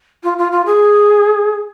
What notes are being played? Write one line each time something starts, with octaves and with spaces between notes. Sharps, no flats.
F4
F4
F4
G#4